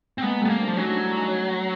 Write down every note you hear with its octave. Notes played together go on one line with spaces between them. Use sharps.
C4
G#3 A#3 B3
G3 A3 B3
A#3
C4 D4
F3
F#3 C#4 D#4
D4 E4
D4 E4
C#4 D#4